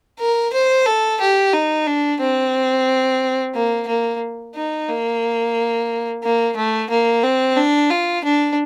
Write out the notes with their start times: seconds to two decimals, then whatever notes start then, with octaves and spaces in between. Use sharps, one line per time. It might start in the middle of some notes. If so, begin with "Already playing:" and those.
0.20 A#4
0.53 C5
0.86 A4
1.21 G4
1.53 D#4
1.87 D4
2.20 C4
3.55 A#3
3.88 A#3
4.55 D#4
4.89 A#3
6.23 A#3
6.56 A3
6.90 A#3
7.23 C4
7.57 D4
7.90 F4
8.24 D4